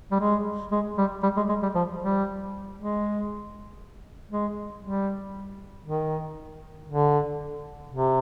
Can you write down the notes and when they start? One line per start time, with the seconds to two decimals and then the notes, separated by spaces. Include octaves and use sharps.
0.11 G3
0.20 G#3
0.72 G#3
0.98 G3
1.23 G3
1.37 G#3
1.49 G#3
1.63 G3
1.75 F3
2.00 G3
2.77 G#3
4.31 G#3
4.83 G3
5.86 D#3
6.88 D3
7.91 C3